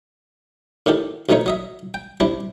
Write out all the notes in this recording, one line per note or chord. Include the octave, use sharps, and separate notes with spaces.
A2 D#3 F#4 G4 A4
D2 B2 F3 A3 D#4 C#5
F#3 D#5 E5
G5
G3 C4 D4 E4